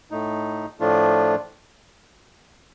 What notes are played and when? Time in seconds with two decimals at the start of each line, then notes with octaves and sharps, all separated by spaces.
0.11 A2 A3 D#4
0.80 A2 F3 A3 D4 F4